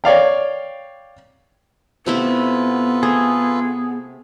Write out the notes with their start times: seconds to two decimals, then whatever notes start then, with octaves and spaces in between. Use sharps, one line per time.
0.04 C#5 D5 F5 G5
2.06 C3 A3 B3 E4 F4 A4 B4
3.03 A3 G#4